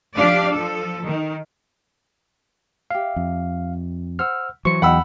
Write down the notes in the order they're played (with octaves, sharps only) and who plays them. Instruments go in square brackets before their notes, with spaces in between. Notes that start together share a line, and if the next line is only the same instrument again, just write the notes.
[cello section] F3 D4 G4 D5 F5
F3 A4
D#3
[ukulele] G4 E5 [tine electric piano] F5
[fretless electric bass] F2
[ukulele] C5 F#5 [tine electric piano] E6 F6
[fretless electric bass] E3 F#3 [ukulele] C5 [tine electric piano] C#6 C#7
[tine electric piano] E2 [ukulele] D#4 G5 [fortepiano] F#5 B5 E6